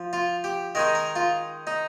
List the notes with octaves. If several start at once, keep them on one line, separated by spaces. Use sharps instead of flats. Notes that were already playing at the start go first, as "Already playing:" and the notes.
Already playing: F3
F4
G4
D#3 G#3 D#4 A#4
A#4
F4
D#4